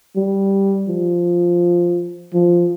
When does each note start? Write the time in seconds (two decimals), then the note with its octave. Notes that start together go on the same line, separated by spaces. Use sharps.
0.16 G3
0.88 F3
2.34 F3